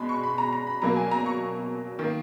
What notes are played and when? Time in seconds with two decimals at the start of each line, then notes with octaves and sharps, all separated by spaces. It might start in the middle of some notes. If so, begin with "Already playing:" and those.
Already playing: B2 G#3 B5
0.09 C#6
0.23 B5
0.38 A#5
0.53 A#5
0.67 B5
0.82 B2 F#3 A#3 A#5
0.96 G#5
1.11 A#5
1.26 C#6
1.99 D#3 A#3